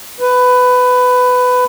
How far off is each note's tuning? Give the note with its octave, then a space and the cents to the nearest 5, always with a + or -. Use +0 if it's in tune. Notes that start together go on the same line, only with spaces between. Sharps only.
B4 +15